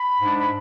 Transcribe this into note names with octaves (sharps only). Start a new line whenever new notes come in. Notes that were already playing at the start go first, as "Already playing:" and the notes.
Already playing: B5
G#2 G#3 D4
B5